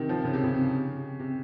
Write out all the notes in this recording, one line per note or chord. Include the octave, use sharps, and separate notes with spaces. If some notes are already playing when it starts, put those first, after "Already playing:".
Already playing: C3 D#3
F3
C#3
C3
C#3
C3